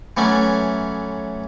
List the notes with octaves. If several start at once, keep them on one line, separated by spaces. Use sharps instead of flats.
E3 F#3 A3 C#4